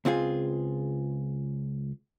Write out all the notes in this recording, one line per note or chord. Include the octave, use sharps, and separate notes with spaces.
C#2 C4 F4 G#4